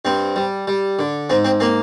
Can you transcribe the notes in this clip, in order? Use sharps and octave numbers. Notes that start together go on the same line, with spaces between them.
G2 C4
G3
G3
D3
G#2 C4
C4
A#3 C4